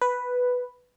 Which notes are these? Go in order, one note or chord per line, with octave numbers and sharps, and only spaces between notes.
B4